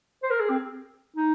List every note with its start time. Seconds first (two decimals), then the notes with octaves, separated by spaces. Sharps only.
0.23 C5
0.30 A#4
0.40 G#4
0.50 C4
1.16 D#4